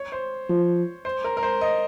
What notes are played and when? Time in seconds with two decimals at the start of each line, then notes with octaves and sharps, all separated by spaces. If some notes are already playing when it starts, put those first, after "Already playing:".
Already playing: C#5
0.12 C5
0.50 F3
1.05 C5
1.24 A#4
1.37 A#4
1.43 C5
1.61 D#5